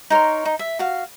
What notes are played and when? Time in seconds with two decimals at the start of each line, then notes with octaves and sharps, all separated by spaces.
0.10 D#4 A#4 C#5 C6
0.45 D#4
0.59 E5
0.79 F#4 F5